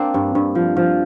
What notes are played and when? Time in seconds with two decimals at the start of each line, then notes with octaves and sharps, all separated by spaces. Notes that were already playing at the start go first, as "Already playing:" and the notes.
Already playing: A#3 C4 D4
0.14 G2
0.35 G2
0.55 F3
0.77 F3